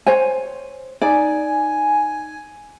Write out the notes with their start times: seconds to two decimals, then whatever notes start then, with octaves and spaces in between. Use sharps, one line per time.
0.07 C5 C#5 G#5
1.02 D#4 D5 G#5